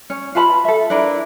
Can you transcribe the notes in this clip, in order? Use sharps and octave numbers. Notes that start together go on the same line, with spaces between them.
C#4
F4 B4 A5 B5
A4 E5
D4 E4 A#4 B4